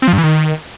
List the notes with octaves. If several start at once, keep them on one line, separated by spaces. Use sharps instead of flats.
C4
F3
G2
E3
D#3